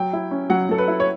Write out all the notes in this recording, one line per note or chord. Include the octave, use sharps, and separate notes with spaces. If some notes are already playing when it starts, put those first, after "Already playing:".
Already playing: F#3 G5
E4
C#4
F#3 F#5
F#3 A4
B4
E4
C#5